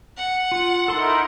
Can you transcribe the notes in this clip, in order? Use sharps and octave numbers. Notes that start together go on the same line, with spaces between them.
F#5
F4
D#4 E4 A4 A#4 C6